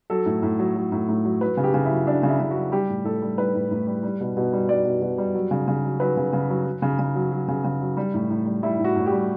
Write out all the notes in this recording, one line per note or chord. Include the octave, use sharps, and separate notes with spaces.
F#3 A4
A2
A2
F#3
F#3
A2
A2
F#3
F#3 B4
C#3
G4
C#3
E4
F#3
F#3 D4
C#3
E4
C#3
F#4
F#3
G3 G4
A2
A2 A4
G3
G3 B4
A2
A2
G3
G3
B2
B2
G3
G3 D5
B2
B2
G3
F#3
C#3
C#3
F#3
F#3 B4
C#3
C#3
F#3
F#3
C#3
C#3
F#3
F#3
C#3
C#3
F#3
G3
A2
A2
G3
G3 E4
A2
F#4
A2
G4
G3